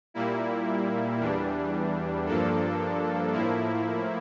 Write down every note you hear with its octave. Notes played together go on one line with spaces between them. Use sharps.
A#2 G3 A#3 E4
E2 E3 G3 D4
G2 F3 A#3 D4 A4
A2 F3 A#3 E4